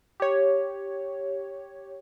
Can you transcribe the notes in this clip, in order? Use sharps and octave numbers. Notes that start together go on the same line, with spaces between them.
G4 C#5